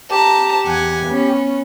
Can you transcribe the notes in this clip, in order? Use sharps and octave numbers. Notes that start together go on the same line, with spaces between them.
G4 A5 A#5
E2 F#5 G#5
B3 C#4